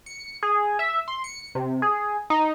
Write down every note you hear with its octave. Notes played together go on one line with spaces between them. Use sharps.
C#7
G#4
E5
C6
C#7
C3
G#4
D#4